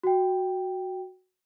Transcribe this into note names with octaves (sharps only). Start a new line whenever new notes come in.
F#4 G5